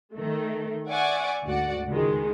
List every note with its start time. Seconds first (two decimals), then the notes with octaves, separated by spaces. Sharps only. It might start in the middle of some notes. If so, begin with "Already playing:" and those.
0.15 D#3 A3
0.89 D5 E5 F#5 G#5 C#6 D6
1.45 D2 G#2 F#4 D5 F#5
1.88 C#2 D#3 G#3